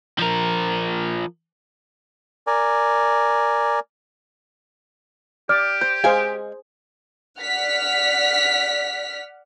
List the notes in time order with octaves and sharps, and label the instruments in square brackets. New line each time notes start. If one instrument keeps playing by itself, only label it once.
[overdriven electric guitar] F3 A#4
[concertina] A#4 D5 G#5
[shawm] G4 [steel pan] D5 [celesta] F6
[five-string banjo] C5 [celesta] G6
[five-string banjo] G#3 F5 G#5 [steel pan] G#4 C5
[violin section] D5 F#5 F6 B6